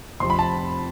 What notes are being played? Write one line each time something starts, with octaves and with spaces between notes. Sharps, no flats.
F1 F2 C3 C6
B5
A5